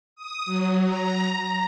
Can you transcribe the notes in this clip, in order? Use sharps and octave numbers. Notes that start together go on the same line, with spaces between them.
D#6
F#3
A#5
A#5